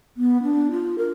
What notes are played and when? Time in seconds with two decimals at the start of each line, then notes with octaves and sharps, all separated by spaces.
0.17 B3
0.43 D4
0.71 F4
0.98 A#4